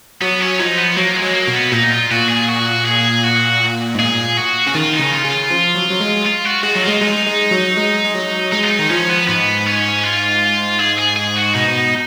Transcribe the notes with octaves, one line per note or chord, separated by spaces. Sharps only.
F#3 B3
C#4
F3 D#4
B3
F#3 A#3
G#3
F#3
A#3
B2
B3
A#2 D#4
F4
A#2 F#4
G#4
F#4
G#4
F#4
G#2
A#2 G#4
F#4
C#3 F#4
D#3 F4
D#4
C#3
F4
C#3
F4
F3
F#3
F#3
G#3
F4
F#4
G#3 F#4
F#3 D#4
F4
G#3
G#3 D#4
G#3
F#3
G#3
G#3
F#3
G#3 D#4
F4
D#4
D#3
F3 C#4
B3
G#2 B3
C#4
F4
G#4
G#4
G#4
F#4
B2 D#4